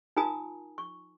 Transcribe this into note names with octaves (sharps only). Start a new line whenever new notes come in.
D#4 F4 A#4 G#5 A#5 D#6
C#6